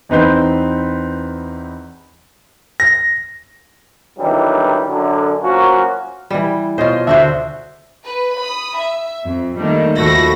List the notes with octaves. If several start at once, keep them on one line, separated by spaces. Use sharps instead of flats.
E2 C4 D#4 B4 C6 G6
A#6
A1 G2 D#3 E3 F#3 G3
F#2 D3
F3 F#3 A#3 C#4 F#4
E3 G3
B2 F4 C5 C#5 D#5
D2 D4 F#4 C5 E5
B4
B5 D#6
E5
F2
D#3 G3 A3 A#3
D#2 F3 A3 F#4 B5 A#6